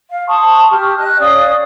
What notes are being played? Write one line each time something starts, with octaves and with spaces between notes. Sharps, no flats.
F5
A5 C6 C#6 D#6
G4 F6
D#5 F#6
C#4 D5 F5 D#6